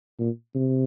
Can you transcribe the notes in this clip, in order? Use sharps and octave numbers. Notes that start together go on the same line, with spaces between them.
A#2
C3